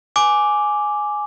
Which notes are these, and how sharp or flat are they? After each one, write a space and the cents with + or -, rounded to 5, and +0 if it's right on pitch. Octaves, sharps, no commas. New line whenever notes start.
G#5 +5 D6 +0